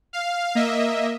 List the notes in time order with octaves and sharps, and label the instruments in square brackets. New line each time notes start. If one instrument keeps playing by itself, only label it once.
[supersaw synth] F5
A#3 D#5 E5